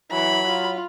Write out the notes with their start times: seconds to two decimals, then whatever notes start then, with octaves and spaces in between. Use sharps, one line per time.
0.11 E3 F#3 B5
0.47 F4